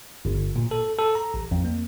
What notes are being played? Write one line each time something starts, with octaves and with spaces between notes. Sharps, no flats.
G1
A#2
A4
A4
A#5
A1
F2
A#3